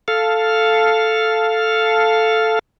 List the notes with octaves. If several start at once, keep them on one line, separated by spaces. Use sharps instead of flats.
A4 F5